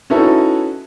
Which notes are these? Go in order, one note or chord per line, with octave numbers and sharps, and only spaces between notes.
C#4 D#4 E4 F#4 A4 B4